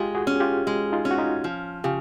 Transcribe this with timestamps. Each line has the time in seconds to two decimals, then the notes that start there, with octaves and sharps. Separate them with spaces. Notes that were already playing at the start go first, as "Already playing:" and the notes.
Already playing: G#3 F4 G4
0.15 F#4 G#4
0.27 C#4
0.40 F4 G4
0.67 G#3
0.92 D#4 F4
1.05 C#4
1.11 F#4
1.18 D#4 F4
1.44 F3
1.84 C#3 F4 G4